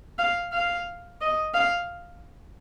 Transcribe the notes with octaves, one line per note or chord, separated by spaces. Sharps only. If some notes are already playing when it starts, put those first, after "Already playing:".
F5
F5
D#5
F5